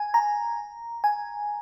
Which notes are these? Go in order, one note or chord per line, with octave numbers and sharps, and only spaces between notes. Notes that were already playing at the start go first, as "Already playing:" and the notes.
Already playing: G#5
A#5
G#5